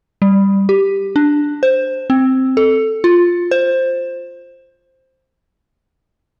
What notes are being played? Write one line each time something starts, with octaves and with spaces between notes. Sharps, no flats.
G3
G4
D4
C5
C4
A4
F4
C5